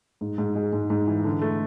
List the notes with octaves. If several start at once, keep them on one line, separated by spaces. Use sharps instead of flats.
G#2
G#2
G#3
G#2
G#2
E3
D3
A3